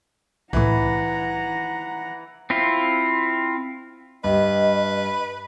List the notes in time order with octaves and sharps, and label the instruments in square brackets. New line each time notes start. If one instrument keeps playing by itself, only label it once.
[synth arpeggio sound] C2 A2 [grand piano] E3 [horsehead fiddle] F#5 A#5
[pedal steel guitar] C4 E4 F4
[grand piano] G2 G4 [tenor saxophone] B4 [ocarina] D#5